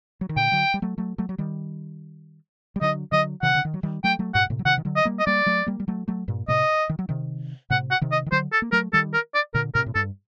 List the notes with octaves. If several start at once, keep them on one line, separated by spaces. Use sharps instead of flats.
F#3
D#3
A#2 D3 G5
D3 F#3
G3
F#3 A3
F#3 A3
F#3 A3
F#3
D#3 G3
G3
D3 F#3 D#5
D3 F#3 D#5
C3 D#3 F#5
D3
D#3
F#3
D#3 G3
F#3 A3 G5
F#3 A3
G2 A#2 F#5
A2 C3
F#3
C3 D#3 F#5
D#3
D3 F#3
D#5
G3 A#3
D#5
G3 A#3 D5
F#3 A3
G3 A#3
G3
F#3 A3
F#3 A3
G2 A#2
A2 C3 D#5
D#3
F#3
C3 D#3
A2 C3 F#5
F#5
C3 D#3
D#5
D#3
D3 F#3 C5
A4
A#3
F#3 A3 A#4
D#3 G3 A4
A#4
D5
A#2 D3 A#4
A2 C3 A#4
A2
G2 A4